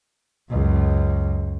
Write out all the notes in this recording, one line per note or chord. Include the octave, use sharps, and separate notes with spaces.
C#2 F#2